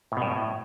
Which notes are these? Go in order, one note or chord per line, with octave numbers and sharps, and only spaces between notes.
A2
B2
G2
B2
A2